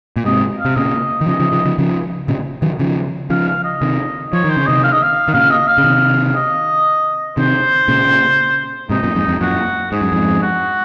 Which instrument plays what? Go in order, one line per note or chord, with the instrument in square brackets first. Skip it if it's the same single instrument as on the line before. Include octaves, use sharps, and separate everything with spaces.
[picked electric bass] A#2
[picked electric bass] G#2 C3 [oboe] D#5
[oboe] F5
[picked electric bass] C3
[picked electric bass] A#2 C#3 [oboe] D#5
[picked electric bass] D#3
[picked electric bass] C#3 F3 [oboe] D#5
[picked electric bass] C#3 F3
C#3 F3
C#3 F3
C#3 F3
A#2 C#3
D#3 F#3
C#3 F3
[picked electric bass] C#3 F3 [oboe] F5
[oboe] F5
D#5
[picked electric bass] C3 D#3
[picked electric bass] F3 [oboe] C#5
[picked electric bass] D#3 [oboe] C5
[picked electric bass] C#3
[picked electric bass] C3 D#3 [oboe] D#5
[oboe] F5
D#5
F5
[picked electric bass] D#3
[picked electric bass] A#2 C#3 [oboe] F5
[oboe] D#5
F5
[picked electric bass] C#3
C3 D#3
[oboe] D#5
[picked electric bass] C3 D#3 [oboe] C5
[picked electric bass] A#2 C#3
[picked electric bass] G#2 C3 [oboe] D#4
[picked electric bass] F#2 A#2
F2 G#2
F2 G#2
[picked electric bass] F#2 A#2 [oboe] F#4
[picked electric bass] G#2 [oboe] G#4
[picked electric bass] F#2
F2 G#2
[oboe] F#4